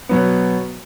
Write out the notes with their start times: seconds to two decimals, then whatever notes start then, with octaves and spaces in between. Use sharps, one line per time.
0.09 B2 F#3 B3